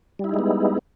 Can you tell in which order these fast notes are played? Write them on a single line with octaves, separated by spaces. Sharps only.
G3 E4 D#4 G#3 B3